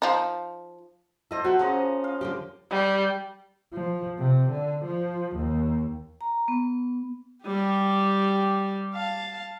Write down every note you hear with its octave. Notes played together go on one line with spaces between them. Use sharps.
F3 D#4
E4 A4 C5 D#5
F#4 G4 F#5 A#5
C#3 F3 C#4 D#5
F5
D3 G3 G4
G3
F3
C3
D3
F3
D#2
A#5
B3
G3 G4
F5 A5